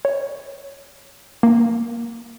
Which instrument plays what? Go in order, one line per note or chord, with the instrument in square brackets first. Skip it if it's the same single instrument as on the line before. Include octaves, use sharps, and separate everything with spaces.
[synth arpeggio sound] C#5
A#3